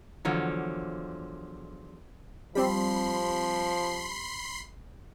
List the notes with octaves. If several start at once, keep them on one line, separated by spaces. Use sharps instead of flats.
E2 D3 F3 F#3
F3 G3 C4 B5 C6 C7